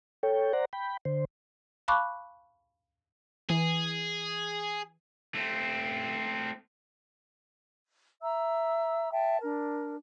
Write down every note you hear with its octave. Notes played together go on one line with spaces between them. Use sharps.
A4 C#5 G5
C5 D5 F#5 A#5
G5 B5
D3 C5
F5 A5 B5 C#6 D6 F#6
E3 G#4
A3 C4
E5 A#5 E6
E5 G5 A5
D4 A#4